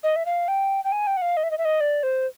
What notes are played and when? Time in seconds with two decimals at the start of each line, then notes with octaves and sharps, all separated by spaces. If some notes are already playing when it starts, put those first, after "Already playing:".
0.03 D#5
0.16 E5
0.26 F5
0.48 G5
0.84 G5
0.92 G#5
1.07 G5
1.17 F#5
1.22 F5
1.37 D#5
1.43 E5
1.51 D#5
1.58 E5
1.65 D#5
1.80 D5
2.03 C5